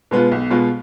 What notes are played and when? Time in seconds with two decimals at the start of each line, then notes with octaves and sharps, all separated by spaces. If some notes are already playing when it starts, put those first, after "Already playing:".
0.11 B2 G#3 B3 F4
0.31 B1
0.50 B2 G#3 B3 F4